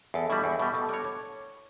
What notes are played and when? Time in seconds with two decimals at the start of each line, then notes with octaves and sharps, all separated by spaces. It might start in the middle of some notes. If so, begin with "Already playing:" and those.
0.14 E2 A4
0.30 B2 G3 E4
0.44 E2
0.60 B2 G3 G4
0.74 B2 A4
0.89 G3 B3 F#4 C#5 D5
1.04 B2 C#5